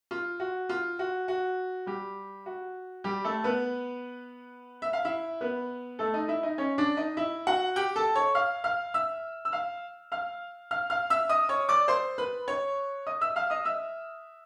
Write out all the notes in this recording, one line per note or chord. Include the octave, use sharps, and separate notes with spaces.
F4
F#4
F4
F#4
F#4
G3 G4
F#4
G3 G4
A3 A4
B3 B4
E5
F5
E4 E5
B3 B4
A3 A4
D#4 D#5
E4 E5
D#4 D#5
C#4 C#5
D4 D5
D#4 D#5
E4 E5
F#4 F#5
G4 G5
A4 A5
C#5 C#6
F5 F6
F5 F6
E5 E6
E6
F5 F6
F5 F6
F5 F6
F5 F6
E5 E6
D#5 D#6
C#5 C#6
D5 D6
C5 C6
B4 B5
C#5 C#6
D#5 D#6
E5 E6
F5 F6
D#5 D#6
E5 E6